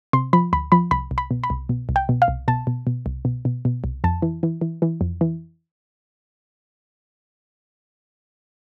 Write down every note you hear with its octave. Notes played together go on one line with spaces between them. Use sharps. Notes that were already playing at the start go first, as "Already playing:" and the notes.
C3 C6
F3 B5
D2 B5
F3 B5
C2 B5
C2
B5
B2
B5
C2
B2
C2
G5
B2
F5
C2
B2 A5
B2
B2
C2
B2
B2
B2
C2
F2 A5
E3
E3
E3
E3
F2
E3